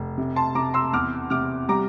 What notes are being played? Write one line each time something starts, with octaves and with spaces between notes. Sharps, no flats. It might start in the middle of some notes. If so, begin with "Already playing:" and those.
Already playing: F1
C3
A5 C6
C3 A#5 D6
C6 E6
E2 D6 F6
C3 D6 F6
G3 A#5 D6